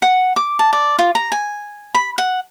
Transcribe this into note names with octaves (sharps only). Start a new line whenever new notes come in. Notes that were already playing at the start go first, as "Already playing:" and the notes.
F#5
D6
A5
D5
F4
A#5
G#5
B5
F#5